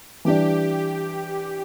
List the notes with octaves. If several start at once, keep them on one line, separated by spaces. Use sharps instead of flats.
E3 G3 D4 G4